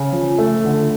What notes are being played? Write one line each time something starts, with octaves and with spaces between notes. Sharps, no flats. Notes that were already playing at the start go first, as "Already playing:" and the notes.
Already playing: C#3
F3
A3
D3